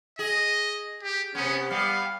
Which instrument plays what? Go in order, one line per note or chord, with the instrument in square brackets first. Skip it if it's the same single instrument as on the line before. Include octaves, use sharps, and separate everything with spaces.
[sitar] G#4 [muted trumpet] D#5
[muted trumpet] G4
[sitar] C3 B3 [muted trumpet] C#4
[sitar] G3 B3 [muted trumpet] F5